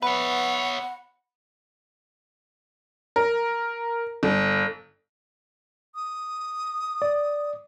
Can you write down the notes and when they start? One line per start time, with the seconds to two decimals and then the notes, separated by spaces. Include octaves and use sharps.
0.03 B3 B4 C#5 E5 F#5 B5
3.16 A#4
4.23 G1
5.95 D#6
7.02 D5